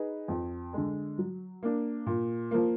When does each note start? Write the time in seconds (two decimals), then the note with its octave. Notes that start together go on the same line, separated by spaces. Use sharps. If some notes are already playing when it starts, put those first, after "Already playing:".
Already playing: D#4 G#4 B4
0.28 F2
0.73 D3 G#3
1.18 F#3
1.63 A#3 D4
2.06 A#2
2.51 F3 A#3